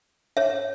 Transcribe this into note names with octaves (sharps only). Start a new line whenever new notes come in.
C#5 E5